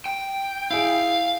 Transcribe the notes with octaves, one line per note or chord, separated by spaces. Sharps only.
G5
E4 G#4 F5